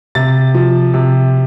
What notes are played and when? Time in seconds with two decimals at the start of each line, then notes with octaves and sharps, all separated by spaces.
0.15 C3 A6
0.54 F3
0.94 C3